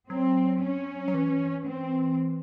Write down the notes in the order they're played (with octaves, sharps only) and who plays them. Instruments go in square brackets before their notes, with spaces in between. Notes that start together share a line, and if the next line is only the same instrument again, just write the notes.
[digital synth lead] F#3 [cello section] C4
[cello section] C#4
[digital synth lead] F#3
E3
[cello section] C4